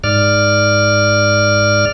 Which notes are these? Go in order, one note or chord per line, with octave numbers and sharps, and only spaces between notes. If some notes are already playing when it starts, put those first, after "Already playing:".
G#2 D5 F6